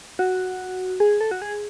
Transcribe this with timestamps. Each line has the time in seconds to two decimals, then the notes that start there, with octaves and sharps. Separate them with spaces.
0.19 F#4
1.00 G#4
1.21 A4
1.31 F#4
1.42 G#4